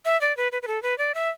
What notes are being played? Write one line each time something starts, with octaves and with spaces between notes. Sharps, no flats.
E5
D5
B4
B4
B4
A4
B4
D5
E5